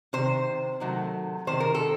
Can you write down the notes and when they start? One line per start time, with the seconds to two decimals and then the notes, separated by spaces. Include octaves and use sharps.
0.13 C3 D#3 C5
0.80 C3 D#3 F#3 A3
1.47 C3 D#3 C5
1.60 A#4
1.74 A4